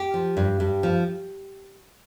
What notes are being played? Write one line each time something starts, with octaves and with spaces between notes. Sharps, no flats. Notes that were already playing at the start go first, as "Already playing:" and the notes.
Already playing: G4
F3
G2
G2
F3